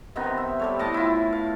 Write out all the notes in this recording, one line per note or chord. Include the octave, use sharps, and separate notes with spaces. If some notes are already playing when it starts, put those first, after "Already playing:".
C3 D#3 B3 D#4
E5
G3 A4 C#5
A2 D#5 A5
E4 F4
F5